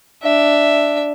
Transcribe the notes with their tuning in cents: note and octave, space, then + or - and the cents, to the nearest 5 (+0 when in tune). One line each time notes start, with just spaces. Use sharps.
D4 +0 E5 +0